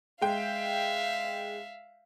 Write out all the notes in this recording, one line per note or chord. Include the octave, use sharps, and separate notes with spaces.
G#3 E5 F5 G5